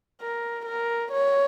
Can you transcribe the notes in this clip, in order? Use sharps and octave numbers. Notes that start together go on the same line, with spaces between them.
A#4
A#4
C#5